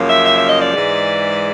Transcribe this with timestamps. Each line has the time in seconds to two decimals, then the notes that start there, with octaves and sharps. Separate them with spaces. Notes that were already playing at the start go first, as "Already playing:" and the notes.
Already playing: F#2 C#3 F3 A#3
0.08 E5
0.25 E5
0.37 E5
0.48 D#5
0.60 D5
0.72 G#2 E3 G#3